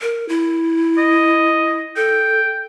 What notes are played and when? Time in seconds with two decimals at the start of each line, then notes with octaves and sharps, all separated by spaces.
0.01 A#4
0.29 E4
0.98 D#5
1.96 A4 G5